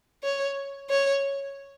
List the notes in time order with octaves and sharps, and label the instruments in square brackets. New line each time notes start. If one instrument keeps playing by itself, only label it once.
[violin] C#5
C#5